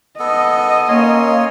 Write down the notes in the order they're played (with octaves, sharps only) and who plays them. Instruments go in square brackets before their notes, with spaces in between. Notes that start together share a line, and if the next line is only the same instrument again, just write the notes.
[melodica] B3 A4 [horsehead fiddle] D#5
[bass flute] A#3 [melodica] C#4 C#5 C6